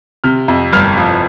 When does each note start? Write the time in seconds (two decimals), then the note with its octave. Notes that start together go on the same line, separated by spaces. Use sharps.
0.24 C3 F6
0.48 F2
0.72 G1 F6
0.97 F3